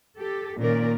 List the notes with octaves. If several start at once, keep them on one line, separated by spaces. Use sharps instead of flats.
G4 A4
A#2 D#3 A#3 C#4 A#4 D5